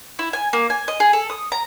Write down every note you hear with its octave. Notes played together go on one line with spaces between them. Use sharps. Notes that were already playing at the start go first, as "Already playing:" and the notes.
E4
G#5
A#3
G#5
D#5
G#4
A4
D#6
A#5